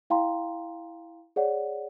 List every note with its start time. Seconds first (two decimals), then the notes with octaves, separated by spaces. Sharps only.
0.10 E4 F5 G5 A#5 C6
1.36 G#4 C#5 D5 F#5